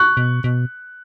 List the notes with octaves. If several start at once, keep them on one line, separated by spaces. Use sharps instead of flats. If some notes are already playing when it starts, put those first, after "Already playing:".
Already playing: C#6 F#6
B2
B2